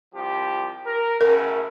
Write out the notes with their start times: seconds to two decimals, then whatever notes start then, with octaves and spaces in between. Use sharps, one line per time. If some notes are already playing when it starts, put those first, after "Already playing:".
0.14 C2 F3 G4
0.85 A#4
1.21 F#2 A2 C#3 A#4